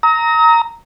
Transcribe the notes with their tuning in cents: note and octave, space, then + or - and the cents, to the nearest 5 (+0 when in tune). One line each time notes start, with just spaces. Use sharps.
A#5 -5 D#6 +45